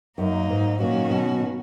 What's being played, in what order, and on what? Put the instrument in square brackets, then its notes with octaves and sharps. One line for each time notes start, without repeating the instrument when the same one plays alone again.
[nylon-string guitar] F#2 [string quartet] F#3 A#3 D#4
[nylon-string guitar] G#2
[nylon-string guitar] A#2 [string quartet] D#3 F#3 C#4 F#4
[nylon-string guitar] B2